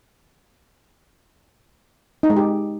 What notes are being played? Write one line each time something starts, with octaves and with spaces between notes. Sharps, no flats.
D#4
G#3
G4